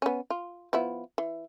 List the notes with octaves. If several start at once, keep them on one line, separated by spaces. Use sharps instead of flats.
B3 C#4
F4
F3 B3 E4
E3